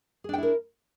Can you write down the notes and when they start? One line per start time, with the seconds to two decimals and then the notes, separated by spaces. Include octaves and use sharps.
0.24 G#4
0.29 D4
0.33 G5
0.38 E4
0.43 A#4